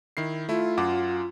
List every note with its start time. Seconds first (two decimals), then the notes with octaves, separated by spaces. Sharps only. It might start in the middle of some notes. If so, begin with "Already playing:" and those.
0.17 D#3 E4 C7
0.49 A3 E4 F4
0.78 F#2 F#5 D6